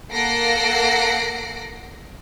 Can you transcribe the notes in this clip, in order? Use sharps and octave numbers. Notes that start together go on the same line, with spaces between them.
A#3 A4 F#5 A#6 C7 D7